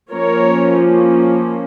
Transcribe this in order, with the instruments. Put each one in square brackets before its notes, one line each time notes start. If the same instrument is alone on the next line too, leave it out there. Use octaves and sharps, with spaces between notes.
[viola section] F3 A#3 C#4 A#4 C#5